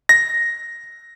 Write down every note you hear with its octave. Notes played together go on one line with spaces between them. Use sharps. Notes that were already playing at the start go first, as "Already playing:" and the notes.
A#6